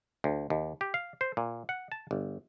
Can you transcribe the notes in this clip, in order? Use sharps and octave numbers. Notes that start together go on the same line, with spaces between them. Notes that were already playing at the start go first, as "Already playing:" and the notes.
D2
D#2
G4
F5
C5
A#2
F#5
A5
G1